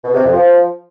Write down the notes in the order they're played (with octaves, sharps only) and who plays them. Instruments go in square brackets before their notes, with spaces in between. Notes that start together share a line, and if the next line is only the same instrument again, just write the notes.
[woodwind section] B2
C3
F2
F3